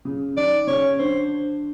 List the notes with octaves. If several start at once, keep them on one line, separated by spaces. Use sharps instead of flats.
C#3
D#3 D5
C#3 C#5
D3 C5